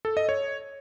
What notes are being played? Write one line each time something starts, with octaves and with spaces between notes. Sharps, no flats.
A4
D#5
C#5